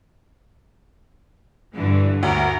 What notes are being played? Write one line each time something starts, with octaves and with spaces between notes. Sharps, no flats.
G2 D3 E3
D2 A#4